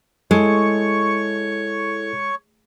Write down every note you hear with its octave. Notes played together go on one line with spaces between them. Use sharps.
G#3 E4 A4 C#5 C#6